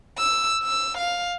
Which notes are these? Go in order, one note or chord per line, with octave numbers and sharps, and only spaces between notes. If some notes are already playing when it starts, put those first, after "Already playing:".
E6
E6
F5